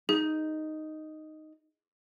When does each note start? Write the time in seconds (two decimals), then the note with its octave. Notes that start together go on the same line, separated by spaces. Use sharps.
0.09 D#4 G#4